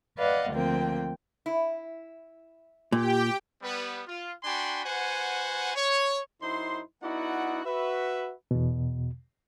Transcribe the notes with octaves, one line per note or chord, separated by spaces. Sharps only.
B4 D5 D#5 F5 F#5
D2 F3 A#3 C4 G5
E4
A#2 G4 G5
G3 B3 B4
F4
D4 F#4 G5 G#5 B5 C6
F#4 B4 C5 F#5 G#5
C#5
F#2 D#4 E4 C5 C6
B3 D#4 E4 F#4 D5 F#5
F#4 B4 E5
E2 B2